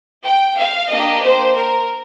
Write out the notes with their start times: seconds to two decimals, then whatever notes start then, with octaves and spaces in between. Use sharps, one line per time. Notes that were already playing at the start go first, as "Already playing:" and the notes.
0.24 G5
0.58 F5
0.90 A#3 D4 G4 D#5
1.23 C5
1.56 A#4